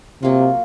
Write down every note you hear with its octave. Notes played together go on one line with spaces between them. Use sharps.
C3 F#3 A#3 F4